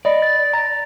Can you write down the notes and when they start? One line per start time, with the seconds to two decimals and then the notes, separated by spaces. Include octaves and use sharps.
0.05 D5 D#5 B5
0.22 A6
0.53 A#5 A6